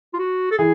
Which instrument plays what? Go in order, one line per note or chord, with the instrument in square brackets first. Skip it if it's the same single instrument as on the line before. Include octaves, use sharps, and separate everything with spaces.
[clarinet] F4
F#4
A4
[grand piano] E3 [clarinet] G#4